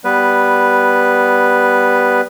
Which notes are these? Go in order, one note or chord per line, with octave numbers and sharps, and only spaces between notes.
G3 B3 B4